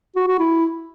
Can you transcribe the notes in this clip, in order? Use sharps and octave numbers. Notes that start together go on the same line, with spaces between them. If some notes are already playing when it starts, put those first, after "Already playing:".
F#4
F#4
E4